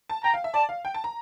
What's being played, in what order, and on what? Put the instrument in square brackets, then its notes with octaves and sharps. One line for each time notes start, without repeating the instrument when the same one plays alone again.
[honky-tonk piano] A5
[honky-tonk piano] G5 [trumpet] A#5
[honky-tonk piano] F5
E5
[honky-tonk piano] D5 [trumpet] A5
[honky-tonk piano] F5
G5
A5
A#5